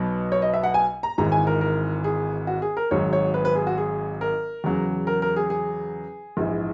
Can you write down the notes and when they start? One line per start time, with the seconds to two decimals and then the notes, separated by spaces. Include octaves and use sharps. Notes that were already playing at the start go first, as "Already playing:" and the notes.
Already playing: B1 B2 F#3
0.32 C#5
0.42 D#5
0.54 E5
0.63 F#5
0.74 G#5
1.03 A#5
1.18 G#1 G#2 E3 A#5
1.32 G#5
1.47 A#4
1.61 A#4
2.04 G#4
2.47 F#4
2.62 G#4
2.77 A#4
2.91 G#1 G#2 F#3 C#5
3.13 C#5
3.34 B4
3.45 B4
3.55 G#4
3.67 F#4
3.78 G#4
4.21 A#4
4.64 E2 C#3 F#3
5.07 A#4
5.22 A#4
5.36 G#4
5.50 G#4
6.37 A#1 G#2 E3